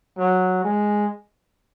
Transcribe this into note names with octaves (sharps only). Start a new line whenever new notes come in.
F#3
G#3